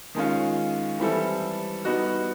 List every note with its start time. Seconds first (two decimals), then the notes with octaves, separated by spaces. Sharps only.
0.15 D#3 G#3 C#4 F4
0.99 E3 G3 C4 E4 A4
1.85 G3 B3 D#4 F#4